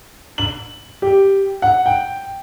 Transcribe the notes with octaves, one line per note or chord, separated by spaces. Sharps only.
F#7
G4
F#5
G5